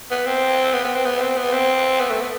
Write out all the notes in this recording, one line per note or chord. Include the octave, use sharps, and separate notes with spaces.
B3
C4
B3
B3
C4
B3
C4
B3
C4
B3
A3
B3